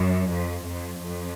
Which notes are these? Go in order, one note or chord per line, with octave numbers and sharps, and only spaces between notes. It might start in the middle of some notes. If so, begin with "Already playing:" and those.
Already playing: F#2
F2
F2
F2